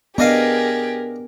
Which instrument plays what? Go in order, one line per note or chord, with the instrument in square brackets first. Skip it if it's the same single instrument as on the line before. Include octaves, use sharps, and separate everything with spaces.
[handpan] B3 [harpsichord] D4 D#5 F5 [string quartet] G4 G#4 [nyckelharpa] A#4